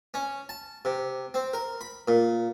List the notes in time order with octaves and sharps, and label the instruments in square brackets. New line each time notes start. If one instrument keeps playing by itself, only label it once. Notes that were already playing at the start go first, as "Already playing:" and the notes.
[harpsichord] C#4
A5
C3
C4
A#4
B5
A#2